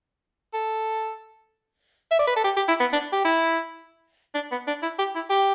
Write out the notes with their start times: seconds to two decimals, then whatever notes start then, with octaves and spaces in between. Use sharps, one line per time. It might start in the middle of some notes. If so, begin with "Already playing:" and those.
0.54 A4
2.11 E5
2.19 D5
2.27 B4
2.36 A4
2.44 G4
2.57 G4
2.68 E4
2.80 B3
2.93 D4
3.13 G4
3.24 E4
4.34 D4
4.52 B3
4.67 D4
4.82 E4
4.99 G4
5.15 E4
5.30 G4